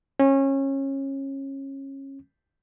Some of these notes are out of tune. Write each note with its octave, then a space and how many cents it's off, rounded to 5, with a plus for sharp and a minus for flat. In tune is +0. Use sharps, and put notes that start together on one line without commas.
C#4 -25